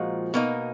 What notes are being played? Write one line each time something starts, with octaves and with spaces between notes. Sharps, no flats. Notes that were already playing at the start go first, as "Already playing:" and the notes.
Already playing: A#2 F3 G#3 D#4 F#4
B2 A#3 D#4